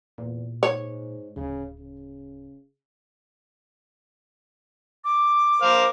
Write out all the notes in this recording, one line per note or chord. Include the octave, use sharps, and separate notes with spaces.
E2 A#2
G#2 C#5
D1 C#3
C#3
D6
A#4 C5 F5